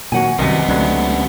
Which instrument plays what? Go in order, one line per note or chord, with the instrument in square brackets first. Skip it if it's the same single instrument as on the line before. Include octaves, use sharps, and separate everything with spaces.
[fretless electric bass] A#2 D#3 F#3 [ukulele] F#4 F#5 G#5
[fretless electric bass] C2 F#2 [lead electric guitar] C3 B3 [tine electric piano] D#3 G3 [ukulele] D#5 G#5
[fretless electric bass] C#2 C#4 D4 [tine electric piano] D3 F#3 A3